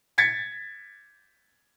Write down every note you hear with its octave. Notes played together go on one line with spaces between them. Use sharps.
G#6 A6 B6 C#7